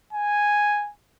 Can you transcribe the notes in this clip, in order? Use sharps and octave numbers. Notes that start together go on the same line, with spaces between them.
G#5